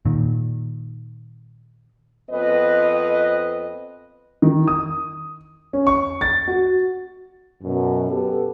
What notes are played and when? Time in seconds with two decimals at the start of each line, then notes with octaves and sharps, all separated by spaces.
0.05 A#2 D#3
2.30 F2 B3 B4 D#5
4.42 D#3
4.68 D#6
5.73 C#4
5.87 C#6
6.21 A6
6.48 F#4
7.63 F#2 B2
8.10 B3 G4 A4